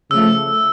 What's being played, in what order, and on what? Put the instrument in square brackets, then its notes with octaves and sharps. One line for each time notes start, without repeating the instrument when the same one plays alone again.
[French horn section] C#3 F3 A3 [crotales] E6